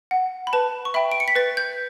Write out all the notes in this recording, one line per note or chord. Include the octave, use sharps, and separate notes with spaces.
F#5
B5
B4 A5
C#6
E5 G5 B5
D7
C#7
B6
B4 A6
G6